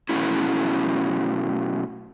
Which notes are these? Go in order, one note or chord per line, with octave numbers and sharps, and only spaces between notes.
B2 F3 F#3 A3 C#4 E4